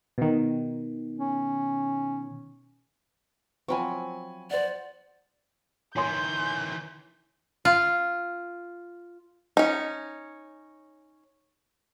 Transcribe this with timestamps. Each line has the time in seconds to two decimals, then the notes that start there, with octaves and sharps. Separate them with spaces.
0.18 B2 D#3
1.18 C#4
3.68 F3 F#3 C4 G#5 B5 C#6
4.51 C5 D5 F#5
5.96 D#3 E3 C#5 G#5 C6 G6
7.65 F4
9.57 C#4 D#4